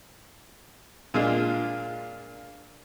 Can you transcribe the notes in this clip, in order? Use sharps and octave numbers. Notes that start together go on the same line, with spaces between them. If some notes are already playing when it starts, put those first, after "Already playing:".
A#2 G#3 D4 F4